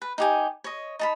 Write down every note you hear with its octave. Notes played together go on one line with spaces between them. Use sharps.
B4
D#4 G4 G#5
C#5 D#5
D#4 A5 B5